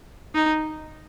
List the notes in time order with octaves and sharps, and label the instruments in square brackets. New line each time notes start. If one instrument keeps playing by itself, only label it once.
[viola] D#4